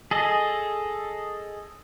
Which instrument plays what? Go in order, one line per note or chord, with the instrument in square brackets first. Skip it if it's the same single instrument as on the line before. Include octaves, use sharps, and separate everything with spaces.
[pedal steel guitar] G#4 A4 D#5